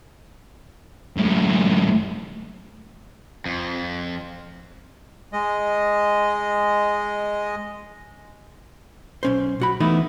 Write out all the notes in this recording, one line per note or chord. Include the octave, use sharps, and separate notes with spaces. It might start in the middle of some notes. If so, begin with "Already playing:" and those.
F#2 A2
F2
G#3 D#5
B1 C#4 C5
B1 F#4 B5
E3 A3 B3 D#4 E4